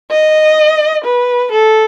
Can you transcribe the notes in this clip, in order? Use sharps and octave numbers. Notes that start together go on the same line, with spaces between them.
D#5
B4
A4